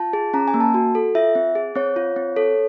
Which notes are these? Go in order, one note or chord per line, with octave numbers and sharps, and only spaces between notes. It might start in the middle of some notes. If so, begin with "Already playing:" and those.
Already playing: F4 A5
G#4
C#4 A#5
G#5
A#3
A5
F#4
A4
F4 E5
C4
G#4
C4 C#5
F4
C4
A4 C#5